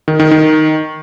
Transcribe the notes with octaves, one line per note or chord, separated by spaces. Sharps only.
D#3
D#3
D#3